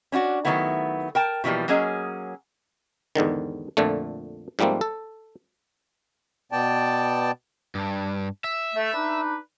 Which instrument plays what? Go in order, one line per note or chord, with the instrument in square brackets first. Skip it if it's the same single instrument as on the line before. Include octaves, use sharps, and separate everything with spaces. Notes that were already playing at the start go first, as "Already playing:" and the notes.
[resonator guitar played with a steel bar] C#4 D4 F4 F#4
D#3 E3 F#3 A3 B3 E4
A#4 G5 A5
B2 E3 F3 G3 A#3
F#3 A#3 C#4 G#4 D#5
[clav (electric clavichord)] E2 G#2 D3 D#3
F2 A#2 D3 A3
G#2 F3 G3 A3 A#3 C4
A4
[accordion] B2 B3 D5 G5 A5
[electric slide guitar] G2
E5
[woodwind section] A3
D4 D#4 B4